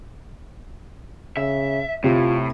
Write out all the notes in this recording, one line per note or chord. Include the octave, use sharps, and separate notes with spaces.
C#3 E5
A2 C3 F4